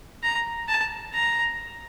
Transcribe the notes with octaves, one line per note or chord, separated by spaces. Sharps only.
A#5
A5
A#5